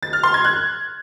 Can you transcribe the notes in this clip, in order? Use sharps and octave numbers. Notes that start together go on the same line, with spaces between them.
A6
F6
C6
G#6
F#6